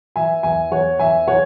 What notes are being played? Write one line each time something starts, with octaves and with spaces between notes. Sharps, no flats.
E3 E5 G#5
E2 E5 G#5
E2 C#5 F#5
E3 E5 G#5
E3 C#5 F#5